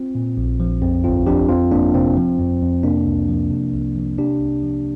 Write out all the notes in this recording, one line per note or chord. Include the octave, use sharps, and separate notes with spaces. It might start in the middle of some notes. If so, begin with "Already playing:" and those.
Already playing: C4 F4
A#2
A#1
F3
F2 C4
G1 C4 F4
F3 D4 G4
F2 C4 F4
G1 A#3 D4
C3 C4
F3
F2
F2
C3 A#3 D4
C2
F3
C3
C2
F3
C3 D4 G4
C2
F3